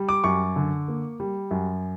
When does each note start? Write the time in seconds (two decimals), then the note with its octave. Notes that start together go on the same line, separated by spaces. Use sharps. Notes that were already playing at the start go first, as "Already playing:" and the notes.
Already playing: G3
0.09 D6
0.24 F#2 C#6
0.56 D3
0.88 A#3
1.20 G3
1.51 F#2